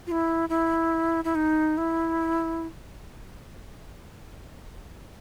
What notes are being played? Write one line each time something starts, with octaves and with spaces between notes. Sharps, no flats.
F4
E4
E4
E4
D#4
E4